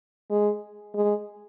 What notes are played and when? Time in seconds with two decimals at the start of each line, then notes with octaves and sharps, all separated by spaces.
0.30 G#3
0.94 G#3